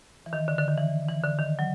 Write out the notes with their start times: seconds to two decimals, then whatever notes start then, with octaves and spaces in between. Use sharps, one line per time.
0.26 E3
0.33 D#3
0.48 D3
0.58 D3
0.68 D#3
0.78 E3
1.09 E3
1.24 D3
1.39 D#3
1.59 F#3